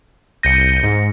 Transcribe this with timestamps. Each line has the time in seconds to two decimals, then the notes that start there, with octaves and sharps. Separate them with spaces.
0.43 C2 G6 A#6 C#7 D#7
0.83 G#2